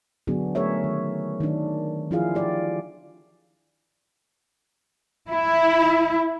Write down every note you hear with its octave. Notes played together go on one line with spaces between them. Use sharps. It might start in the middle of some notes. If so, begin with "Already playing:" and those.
D3 F#3 B3 D4 F#4 G#4
A3 G#4 A#4 C#5 E5
D#3
D#3 D4
F3 D4 E4 F4 G#4 F5
G4 D5
E4